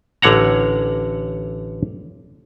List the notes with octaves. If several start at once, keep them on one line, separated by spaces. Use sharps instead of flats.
A1 D3 C#5 F#5 A#5